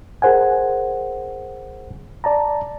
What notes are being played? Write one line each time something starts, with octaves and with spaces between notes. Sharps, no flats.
G#4 A#4 C5 F#5 G#5
D5 A5 A#5